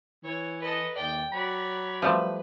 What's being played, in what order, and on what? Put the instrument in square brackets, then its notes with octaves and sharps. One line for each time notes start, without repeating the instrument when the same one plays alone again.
[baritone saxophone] E3 [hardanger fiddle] C#5
[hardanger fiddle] A4 D#5 [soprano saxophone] B4
[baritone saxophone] D#2 [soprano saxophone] D5 [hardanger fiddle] G5
[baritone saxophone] F#3 [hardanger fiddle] C#5 D5 [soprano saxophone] B5
[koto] F3 G3 A3 [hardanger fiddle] B4